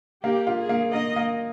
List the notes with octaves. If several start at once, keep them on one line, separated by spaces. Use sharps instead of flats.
A#3 G4
F4
G#4
A#3
A#3 D#5
A#3